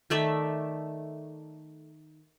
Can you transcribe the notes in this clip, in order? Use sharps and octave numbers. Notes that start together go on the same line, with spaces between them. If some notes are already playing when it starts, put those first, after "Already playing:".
D#3 A3 D5 E5